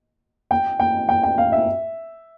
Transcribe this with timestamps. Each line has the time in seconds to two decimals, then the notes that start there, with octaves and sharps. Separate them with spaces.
0.51 G5
0.80 G5
1.09 G5
1.23 G5
1.38 F5
1.52 E5